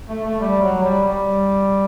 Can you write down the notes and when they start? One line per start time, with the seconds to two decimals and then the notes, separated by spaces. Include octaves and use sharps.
0.09 A3
0.24 A3
0.40 G3
0.62 F#3
0.83 G3
1.04 G3